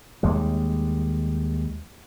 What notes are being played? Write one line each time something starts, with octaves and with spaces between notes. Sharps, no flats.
D#2 G3 G#3